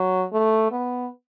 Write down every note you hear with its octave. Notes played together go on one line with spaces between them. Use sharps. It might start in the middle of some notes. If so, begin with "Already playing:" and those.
Already playing: F#3
A3
B3